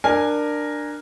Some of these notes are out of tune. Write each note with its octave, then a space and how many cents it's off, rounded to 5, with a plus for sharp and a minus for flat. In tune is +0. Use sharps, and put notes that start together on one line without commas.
D4 +15 A#4 +0 G#5 -10